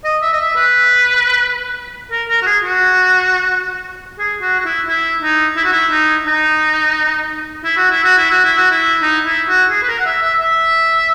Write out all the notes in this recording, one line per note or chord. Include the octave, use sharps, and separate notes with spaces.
D#5
E5
D#5
E5
B4
A#4
A#4
F#4
G#4
F#4
G#4
F#4
F#4
E4
E4
D#4
E4
F#4
E4
D#4
D#4
E4
F#4
E4
F#4
E4
F#4
E4
F#4
E4
D#4
E4
F#4
G#4
B4
A#4
F#5
E5
E5
E5